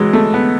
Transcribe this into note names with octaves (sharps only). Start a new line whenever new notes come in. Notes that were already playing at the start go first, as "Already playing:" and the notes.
Already playing: E3 F#3 G#3
A3
B3